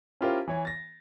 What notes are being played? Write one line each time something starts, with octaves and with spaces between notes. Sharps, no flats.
C#4 E4 F4 G4 A#4 C5
E3 C#5 G#5
A6 A#6